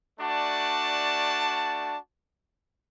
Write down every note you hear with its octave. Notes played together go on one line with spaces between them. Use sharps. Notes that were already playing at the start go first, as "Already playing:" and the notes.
A3 D4 F#4 D5 A5